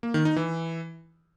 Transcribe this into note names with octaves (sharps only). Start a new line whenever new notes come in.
A#3
D#3
D#4
E3